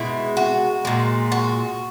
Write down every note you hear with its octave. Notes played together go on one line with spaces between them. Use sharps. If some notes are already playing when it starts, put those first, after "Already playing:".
Already playing: B2 G#3 E4
F#4
A#2 G#3
F#4